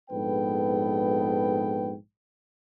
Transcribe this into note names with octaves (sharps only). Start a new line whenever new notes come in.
A#1 G#2 B3 A4 B4 G5